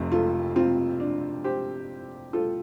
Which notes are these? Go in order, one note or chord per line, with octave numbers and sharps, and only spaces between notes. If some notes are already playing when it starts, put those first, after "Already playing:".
Already playing: F1 F2 C3
F4 A4
C4 F4
D4
G4 C5
F4 A4